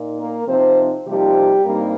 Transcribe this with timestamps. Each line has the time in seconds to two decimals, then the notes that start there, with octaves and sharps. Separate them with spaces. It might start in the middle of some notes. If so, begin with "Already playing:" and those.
Already playing: A#2 D#4
0.19 A#3 A#4
0.48 C3 F3 C4 D#4 C5
1.07 C3 F3 G3 A#3 D#4 G4
1.65 G2 G3 A#3 C4 D#4 A#4